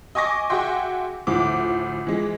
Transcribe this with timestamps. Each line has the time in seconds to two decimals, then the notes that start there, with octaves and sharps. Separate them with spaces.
0.15 D#5 G#5 C#6 D6 A#6
0.50 F#4 G#4 E5 G5 C6
1.27 D2 A2 F3 D6
2.07 E3 F3 G#3